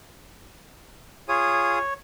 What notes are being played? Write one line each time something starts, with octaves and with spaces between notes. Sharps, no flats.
F4 G#4 C#5 D#6